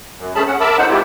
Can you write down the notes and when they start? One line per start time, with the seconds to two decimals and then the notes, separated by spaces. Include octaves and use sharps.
0.18 F#2
0.35 G2 A3 C#4 G#4 A5 B5
0.47 C#4 F#5
0.60 A#4 E5 A5 B5 D6 E6
0.78 A2 D#4 C5 F#5
0.89 G#3 C4 E4 F4 G4